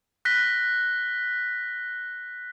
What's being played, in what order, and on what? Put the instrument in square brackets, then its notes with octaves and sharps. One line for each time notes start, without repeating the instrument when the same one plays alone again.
[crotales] F#6 A#6 B6 G7